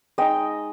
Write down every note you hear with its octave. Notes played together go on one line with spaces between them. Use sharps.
G#3 D#4 D#5 G5